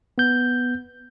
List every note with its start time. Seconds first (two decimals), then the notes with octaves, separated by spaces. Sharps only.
0.18 B3 G6